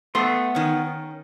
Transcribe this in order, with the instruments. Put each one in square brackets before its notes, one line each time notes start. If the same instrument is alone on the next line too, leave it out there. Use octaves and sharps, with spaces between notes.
[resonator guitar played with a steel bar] A3 [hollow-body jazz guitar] B3 C6
[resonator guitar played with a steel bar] D#3 C#4